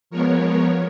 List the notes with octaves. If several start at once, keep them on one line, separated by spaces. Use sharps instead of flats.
F3 G#3 B3 A#4 C#5